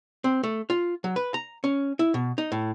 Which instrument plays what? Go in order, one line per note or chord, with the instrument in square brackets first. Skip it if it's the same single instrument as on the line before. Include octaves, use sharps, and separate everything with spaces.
[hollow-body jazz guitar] C4
A3
F4
F#3
B4
A#5
C#4
E4
B2
D#4
A2